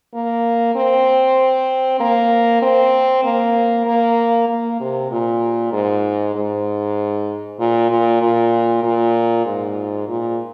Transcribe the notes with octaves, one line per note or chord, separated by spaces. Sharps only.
A#3
C4
A#3
C4
A#3
A#3
A#3
C3
A#2
G#2
G#2
A#2
A#2
A#2
A#2
G#2
A#2